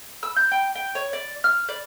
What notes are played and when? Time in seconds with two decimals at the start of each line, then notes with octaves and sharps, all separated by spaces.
0.23 E6
0.36 G6
0.51 G5
0.75 G5
0.95 C#5
1.13 D5
1.44 F6
1.69 D5